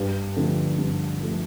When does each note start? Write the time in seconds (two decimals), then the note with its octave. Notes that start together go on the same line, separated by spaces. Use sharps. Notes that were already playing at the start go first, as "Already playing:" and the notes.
Already playing: G2
0.36 D3 F3 A3
0.78 G2
1.21 D3 F3 A3